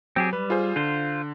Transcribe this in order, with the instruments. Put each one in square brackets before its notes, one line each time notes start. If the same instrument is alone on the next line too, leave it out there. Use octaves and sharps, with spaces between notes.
[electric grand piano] F#3 [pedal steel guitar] C4 G4 G#4
[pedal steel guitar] G3 [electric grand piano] B4
[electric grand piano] F4 G#4 C5
[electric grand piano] D3 [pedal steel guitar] F4 C5